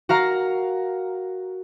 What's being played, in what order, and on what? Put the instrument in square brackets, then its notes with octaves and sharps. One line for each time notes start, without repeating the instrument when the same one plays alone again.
[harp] F#4 A#4 F5 A#5